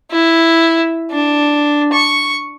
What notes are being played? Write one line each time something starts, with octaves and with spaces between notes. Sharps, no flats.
E4
D4
C#6